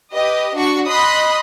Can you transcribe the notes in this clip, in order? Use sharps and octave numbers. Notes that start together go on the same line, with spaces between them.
G4 B4 D#5
D4 F#4 C#6
D#5 B5 C6 D#6 F#6